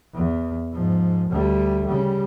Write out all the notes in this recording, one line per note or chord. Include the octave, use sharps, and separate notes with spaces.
E2
G#2 F3
D2 G3
C#3 G3